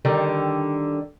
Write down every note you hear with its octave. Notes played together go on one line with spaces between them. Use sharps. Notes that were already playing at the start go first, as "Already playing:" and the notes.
D3 D#3 G3